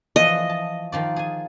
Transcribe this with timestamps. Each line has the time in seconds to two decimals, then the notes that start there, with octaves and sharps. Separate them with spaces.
0.16 E3 F3 D#5
0.49 A5
0.92 D#3 F3 D5
1.16 G#4 G#5